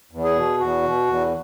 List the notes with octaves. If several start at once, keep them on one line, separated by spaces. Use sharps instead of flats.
E2
G#4
B2
E2 F#4
B2
E2